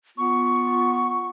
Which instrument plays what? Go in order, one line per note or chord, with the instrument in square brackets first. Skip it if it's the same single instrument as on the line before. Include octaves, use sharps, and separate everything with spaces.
[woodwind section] B3 F4 [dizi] C#6